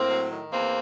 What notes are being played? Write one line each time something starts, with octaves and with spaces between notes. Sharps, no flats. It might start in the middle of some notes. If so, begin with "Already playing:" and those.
Already playing: A2 A#3 C4
F#3
D#3
E2 A#3 C4